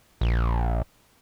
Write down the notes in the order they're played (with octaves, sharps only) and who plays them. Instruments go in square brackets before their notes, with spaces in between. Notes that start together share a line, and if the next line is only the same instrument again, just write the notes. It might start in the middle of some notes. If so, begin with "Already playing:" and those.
[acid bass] A#1